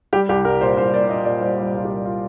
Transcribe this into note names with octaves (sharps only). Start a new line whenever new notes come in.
G3 G4
C2 G4
C2 A#4
A#2 C5
C2 C5
A#2 D5
A#2 D#5
A#2 D5
G3 C5
G3
C5
C2 F4
G4
A#2
F4